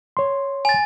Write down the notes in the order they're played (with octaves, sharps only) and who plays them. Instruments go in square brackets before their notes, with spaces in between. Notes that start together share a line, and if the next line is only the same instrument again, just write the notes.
[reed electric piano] C#5 C6
[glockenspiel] G#5 A6